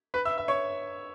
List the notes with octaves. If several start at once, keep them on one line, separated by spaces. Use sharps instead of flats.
B4 B5
E5 E6
E5 E6
C#5 C#6